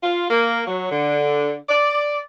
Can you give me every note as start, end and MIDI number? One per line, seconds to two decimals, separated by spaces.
0.03 0.25 65
0.30 0.63 58
0.67 0.89 54
0.91 1.56 50
1.68 2.19 74